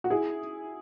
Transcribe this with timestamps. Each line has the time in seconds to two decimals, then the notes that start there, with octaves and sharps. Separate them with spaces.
0.04 F#4
0.10 E4 G#4